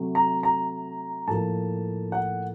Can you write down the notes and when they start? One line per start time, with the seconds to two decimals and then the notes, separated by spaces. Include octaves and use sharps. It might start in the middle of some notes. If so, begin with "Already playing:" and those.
Already playing: C3 F#3 A3
0.15 A#5
0.43 A#5
1.27 A2 F3 A#3 A5
2.12 F#5